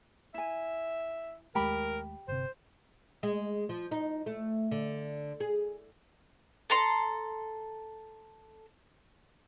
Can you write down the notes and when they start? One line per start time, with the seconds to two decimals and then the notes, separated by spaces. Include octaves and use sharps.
0.34 E4 E5 G#5
1.55 D#2 G#3 A3 G4 A#4 B5
2.28 G1 C3 C5
3.23 G#3
3.69 F3
3.91 D#4
4.26 A3
4.71 D3
5.40 G#4
6.70 A4 A#5 C6